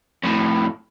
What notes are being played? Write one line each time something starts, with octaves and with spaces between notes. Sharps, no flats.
F2 A2